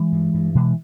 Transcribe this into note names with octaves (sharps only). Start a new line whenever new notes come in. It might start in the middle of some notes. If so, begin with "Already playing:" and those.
Already playing: E3 G#3
G2
G2
B2 E3 G#3